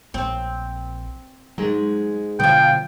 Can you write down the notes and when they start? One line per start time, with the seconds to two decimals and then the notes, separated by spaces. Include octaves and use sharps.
0.14 A#1 C4
1.58 G#2 F#3 G#3
2.40 B2 D3 F3 F#3 G5